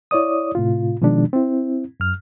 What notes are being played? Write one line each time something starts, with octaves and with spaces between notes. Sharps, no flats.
E4 C#5 D5 D#6
A2 C3 F4
B2 D#3 F3 G#3 D4
C4 E4
F#2 F6